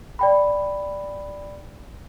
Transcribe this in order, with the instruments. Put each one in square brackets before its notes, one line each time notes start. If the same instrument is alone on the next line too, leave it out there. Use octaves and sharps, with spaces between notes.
[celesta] D5 G5 B5